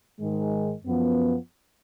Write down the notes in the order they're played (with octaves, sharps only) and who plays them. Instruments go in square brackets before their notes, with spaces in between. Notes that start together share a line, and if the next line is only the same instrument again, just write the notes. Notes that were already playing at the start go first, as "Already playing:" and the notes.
[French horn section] G#2 D#3 G#3
F#2 F3 B3